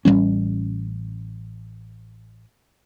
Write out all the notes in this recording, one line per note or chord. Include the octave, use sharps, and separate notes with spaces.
A1 F#3 G3 C#4